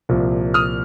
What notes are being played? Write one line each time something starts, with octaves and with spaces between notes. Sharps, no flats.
C2 A#2 F3
D#6 F6